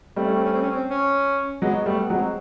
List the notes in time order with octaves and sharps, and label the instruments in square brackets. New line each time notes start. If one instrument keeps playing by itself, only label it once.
[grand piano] G3 A3 [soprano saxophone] C4
[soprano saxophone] C#4
C4
C#4
C4
C#4
C4
C#4
[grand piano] F#3 G#3 [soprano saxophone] B3
[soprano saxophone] B3
[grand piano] G3 A3
[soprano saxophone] B3
[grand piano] F#3 G#3
[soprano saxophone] C4